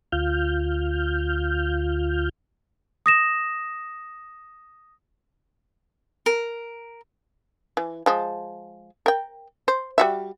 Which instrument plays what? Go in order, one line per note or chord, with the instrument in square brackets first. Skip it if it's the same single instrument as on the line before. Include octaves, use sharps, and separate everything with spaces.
[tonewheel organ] D2 F4 F6 G6
[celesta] D#6 A#6 E7
[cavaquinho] A#4
[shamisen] E3
F3 G#3
A#4 G5
C5
G3 F#4 E5